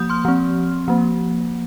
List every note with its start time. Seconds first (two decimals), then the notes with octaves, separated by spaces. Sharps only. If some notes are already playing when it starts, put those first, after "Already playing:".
Already playing: F3 A#3 D#6 G6
0.09 C6 F6
0.25 F3 C4
0.88 F3 A#3